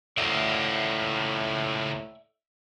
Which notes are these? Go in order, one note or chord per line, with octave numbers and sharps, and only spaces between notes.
C#2 A2 A#3 D5 E5